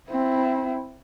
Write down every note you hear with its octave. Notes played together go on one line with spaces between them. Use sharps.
C4 E4